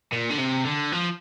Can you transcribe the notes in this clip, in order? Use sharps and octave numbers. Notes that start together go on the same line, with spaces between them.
A#2
D3
C3
D3
F3